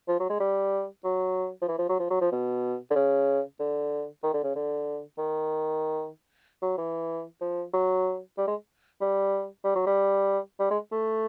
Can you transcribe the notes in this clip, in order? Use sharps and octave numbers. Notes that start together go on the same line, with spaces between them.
F3
F#3
G#3
G3
F#3
F3
E3
F3
F#3
F3
F#3
F3
B2
D3
C#3
D3
D#3
D3
C#3
D3
D#3
F#3
E3
F3
F#3
G3
G#3
G3
G3
F#3
G3
G3
G#3
A3